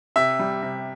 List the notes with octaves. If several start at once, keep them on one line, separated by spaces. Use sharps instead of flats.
C3 E5
G3
C3